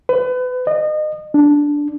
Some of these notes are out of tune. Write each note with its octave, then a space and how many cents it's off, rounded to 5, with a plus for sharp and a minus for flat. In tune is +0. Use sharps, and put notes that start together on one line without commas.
B4 +30
D#5 -30
D4 -5